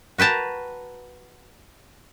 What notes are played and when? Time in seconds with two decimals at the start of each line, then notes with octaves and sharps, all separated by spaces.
0.18 F#4 B4 G5 A5 A#5